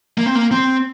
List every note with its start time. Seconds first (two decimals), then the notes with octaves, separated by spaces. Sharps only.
0.18 A#3
0.26 C4
0.35 A#3
0.51 C4